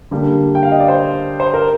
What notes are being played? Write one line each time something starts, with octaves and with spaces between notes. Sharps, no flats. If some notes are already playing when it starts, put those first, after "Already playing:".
D3 G3 A#3 D4
G5
F5
D#5
D5
C5
C5
A#4